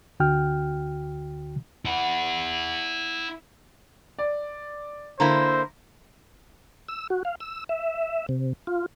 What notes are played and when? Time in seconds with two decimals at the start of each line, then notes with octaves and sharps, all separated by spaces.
0.20 D2 D3 F#4 G5 F6
1.85 E4 F#5
4.19 D5
5.20 D3 A#3 E4 C5 A#5
6.88 E6
7.10 F#4
7.25 F5
7.40 E6
7.69 E5
8.29 C3
8.67 F4